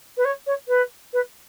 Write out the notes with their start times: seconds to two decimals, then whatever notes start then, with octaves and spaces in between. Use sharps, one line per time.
0.17 B4
0.25 C#5
0.47 C#5
0.68 B4
1.13 B4